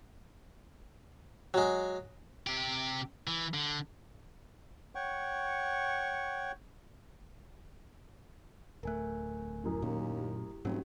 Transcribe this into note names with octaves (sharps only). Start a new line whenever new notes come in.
F#3 G#3
C3 G4
E3
D3
C#5 F#5 G5 C#6
D1 A3 A#4 G#5 F#6
F#2 A2
D#2 A#2
E4 G4
F1 G#2 F#3 C#4 F#4 G4